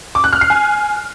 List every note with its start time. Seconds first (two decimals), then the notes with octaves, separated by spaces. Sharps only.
0.15 D6
0.24 F#6
0.33 F6
0.41 C7
0.50 G#5